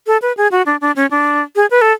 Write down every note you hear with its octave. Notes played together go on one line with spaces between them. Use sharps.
A4
B4
G#4
F#4
D4
D4
C#4
D4
G#4
B4
A4